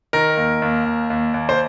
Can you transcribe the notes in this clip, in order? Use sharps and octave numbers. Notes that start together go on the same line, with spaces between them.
D#3 A#4
D#2
D#2
D#2
D#2
D#2
C5